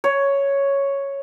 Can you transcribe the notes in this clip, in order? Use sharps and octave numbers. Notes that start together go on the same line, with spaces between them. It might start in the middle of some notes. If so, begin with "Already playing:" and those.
C#5